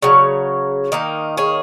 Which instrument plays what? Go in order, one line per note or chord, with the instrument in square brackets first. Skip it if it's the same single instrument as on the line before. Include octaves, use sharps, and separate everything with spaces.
[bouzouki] C#3 F#3
D#3 A#3 D#4
G#4 C#5